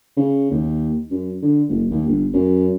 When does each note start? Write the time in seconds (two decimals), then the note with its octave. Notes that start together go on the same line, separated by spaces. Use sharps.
0.17 C#3
0.51 D#2
1.11 F#2
1.42 D3
1.69 F#1
1.91 D#2
2.07 G1
2.33 F#2